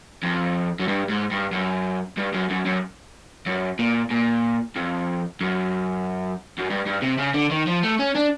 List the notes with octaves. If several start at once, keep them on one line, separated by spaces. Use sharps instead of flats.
F2
F#2
G2
G#2
G2
F#2
G2
F#2
F#2
F#2
F#2
A#2
A#2
F2
F#2
F#2
G2
G2
C3
C#3
D3
D#3
F3
A3
C#4
D4